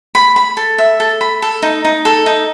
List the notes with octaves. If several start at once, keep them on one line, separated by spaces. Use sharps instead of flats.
B5
B5
A4
E5
A4
B5
A4
D#4
D#4
A4
D#4